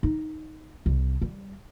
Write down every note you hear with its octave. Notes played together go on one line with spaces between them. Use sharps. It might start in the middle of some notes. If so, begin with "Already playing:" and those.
D#4
C2
G3